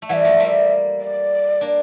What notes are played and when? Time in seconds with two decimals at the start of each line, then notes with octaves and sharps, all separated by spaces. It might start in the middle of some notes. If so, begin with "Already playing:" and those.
0.02 A3
0.09 E3 G3 E5 F#5
0.24 F3 A3
0.40 G3 A#3
1.01 D5
1.61 A#3 D4